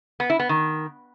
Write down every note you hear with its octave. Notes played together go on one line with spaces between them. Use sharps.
B3
E4
B3
D#3